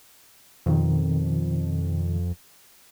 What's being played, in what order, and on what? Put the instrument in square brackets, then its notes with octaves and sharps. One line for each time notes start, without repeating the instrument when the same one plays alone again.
[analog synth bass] F2 [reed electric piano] B2 D#3